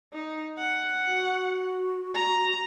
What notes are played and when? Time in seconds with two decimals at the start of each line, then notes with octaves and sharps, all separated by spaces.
0.13 D#4
0.59 F#5
1.06 F#4
2.15 A#5